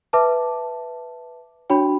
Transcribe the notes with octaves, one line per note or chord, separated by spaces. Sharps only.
B4 E5 A5 D6
D4 F#4 C#5 G5 B5